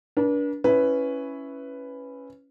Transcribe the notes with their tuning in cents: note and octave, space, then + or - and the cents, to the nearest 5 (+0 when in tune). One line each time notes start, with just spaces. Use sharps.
D4 -25 B4 -45
C#4 +0 E4 +0 B4 +5